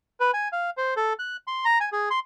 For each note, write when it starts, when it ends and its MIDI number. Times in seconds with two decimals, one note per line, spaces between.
0.20 0.31 71
0.34 0.48 80
0.52 0.70 77
0.77 0.94 72
0.97 1.13 69
1.19 1.37 90
1.47 1.65 84
1.65 1.79 82
1.81 1.89 80
1.92 2.09 68
2.11 2.19 84